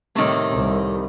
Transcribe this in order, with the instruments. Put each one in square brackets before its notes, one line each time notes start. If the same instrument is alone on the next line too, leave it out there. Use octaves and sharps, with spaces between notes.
[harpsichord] A2 A3 [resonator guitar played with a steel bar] C3 D#3
[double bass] C2